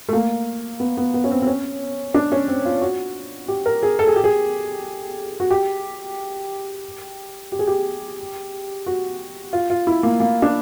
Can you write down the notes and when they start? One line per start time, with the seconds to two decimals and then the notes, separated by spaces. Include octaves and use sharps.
0.09 A3
0.13 A#3
0.80 B3
0.97 B3
1.14 B3
1.24 C#4
1.31 C4
1.42 C4
1.47 C#4
2.14 D4
2.32 C#4
2.48 C4
2.65 F4
2.81 F#4
3.48 G4
3.66 A#4
3.83 G#4
3.99 A4
4.07 G#4
4.16 G4
4.24 G#4
5.40 F#4
5.51 G4
7.52 G4
7.59 G#4
7.67 G4
8.86 F#4
9.53 F4
9.70 F4
9.87 E4
10.03 A#3
10.20 A#3
10.42 D4